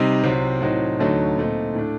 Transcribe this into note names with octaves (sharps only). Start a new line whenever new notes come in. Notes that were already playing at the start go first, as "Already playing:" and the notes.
Already playing: C3 G3 C4 D#4
C2 C3 F#3 C4
A2 F#3 C4 D#4
D2 D3 F#3 A3 D#4
A#2 A3 C4 D#4
A2 A3 D4